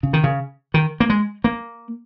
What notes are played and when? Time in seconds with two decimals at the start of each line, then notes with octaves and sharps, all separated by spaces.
0.03 C#3
0.13 D#3
0.24 C#3
0.74 D#3
1.00 A#3
1.10 G#3
1.44 A#3